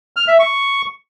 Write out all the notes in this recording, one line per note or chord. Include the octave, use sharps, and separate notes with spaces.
F6
E5
C#6